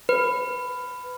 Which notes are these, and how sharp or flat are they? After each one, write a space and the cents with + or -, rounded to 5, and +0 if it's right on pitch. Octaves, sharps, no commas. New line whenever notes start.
B4 +15